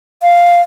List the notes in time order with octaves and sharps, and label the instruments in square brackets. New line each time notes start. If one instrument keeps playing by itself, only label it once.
[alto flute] F5